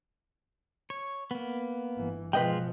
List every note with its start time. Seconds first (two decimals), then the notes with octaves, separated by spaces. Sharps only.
0.90 C#5
1.31 A#3 B3
1.97 G1 E3
2.33 B2 F3 G#3 F4 B4 D#5 G5